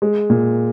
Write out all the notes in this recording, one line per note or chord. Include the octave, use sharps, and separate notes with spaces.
G#3
A#2